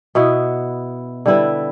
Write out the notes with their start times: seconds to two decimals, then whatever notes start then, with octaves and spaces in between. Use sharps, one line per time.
0.15 B2 B3 E4
1.26 D3 G3 E4 B4